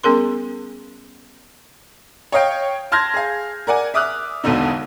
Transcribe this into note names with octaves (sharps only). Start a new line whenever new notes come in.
G3 B3 C#4 G#4 A#4 C6
C#5 D#5 F5 G5
A5 C6 F6 G6 G#6 A#6
G#4 F5
A#4 D5 F#5 G#5
E5 D6 D#6 F6 F#6
E1 B1 B2 D3 D#4